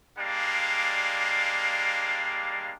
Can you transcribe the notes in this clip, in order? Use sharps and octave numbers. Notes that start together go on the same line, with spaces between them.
G3 G#3 A#3 D4 F5